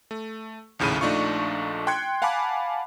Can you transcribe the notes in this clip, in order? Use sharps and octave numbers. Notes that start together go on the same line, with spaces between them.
A3
A#1 D#2 A2 C#3 B5 D#7
A#1 A3 D4 D#4 F4 C#6
G5 C6 F#6 G#6 C#7
F5 F#5 G#5 A5 B5 D6